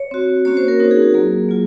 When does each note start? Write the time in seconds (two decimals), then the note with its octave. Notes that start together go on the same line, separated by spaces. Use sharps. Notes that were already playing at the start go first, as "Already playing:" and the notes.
Already playing: C#5
0.11 C4 F#4
0.45 A#3 C#4 F#4 C#5
0.57 C5
0.68 A#4
0.79 C4 D#4 F#4 A#4
0.91 G#4
1.02 F#4
1.14 F#3 A#3 F4 G#4
1.48 F#3 A#3 F4